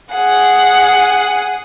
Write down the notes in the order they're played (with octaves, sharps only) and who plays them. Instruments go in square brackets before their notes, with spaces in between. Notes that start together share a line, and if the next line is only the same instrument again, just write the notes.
[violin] G#4 F#5